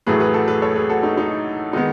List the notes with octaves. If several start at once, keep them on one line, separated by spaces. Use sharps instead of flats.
A1 A2 F#3 A3 G#4 B4
G#4 B4
F#4 A4
G#4 B4
A4 C#5
G#4 B4
F#4 A4
D#4
D#4
D#3 G#3 B3 D#4